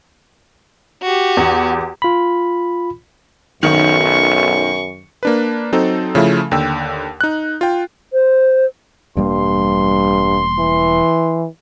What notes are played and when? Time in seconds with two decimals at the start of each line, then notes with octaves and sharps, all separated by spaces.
1.02 F#4 G4
1.37 E2
2.02 F4 B5
3.63 B1 F#2 D#3 C#6
5.23 A#3 D4 B4
5.72 F#3 C4 D#4 A4
6.15 C#3 F3 A3 E4
6.51 D#2 D3 G5 E6
7.21 D#4 F#6
7.61 F4 G5
8.13 C5
9.17 E1 G2 G3 A#3 C6
10.58 E3